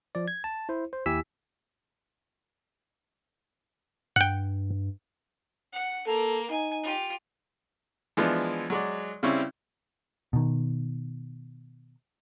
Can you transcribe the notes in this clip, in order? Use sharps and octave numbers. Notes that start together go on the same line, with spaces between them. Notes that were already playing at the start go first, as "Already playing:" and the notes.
F3 D5
G#6
A5
E4 C5
C5
D#2 E4 G4 G#5 E6 B6
G2 F#5 G5
F#5
A#3 A4
D#4 G#5
F4 G4
E3 F3 G#3 B3 D4 E4
F#3 G#3 D5
C#3 G3 C4 C#4 E4
B2 D#3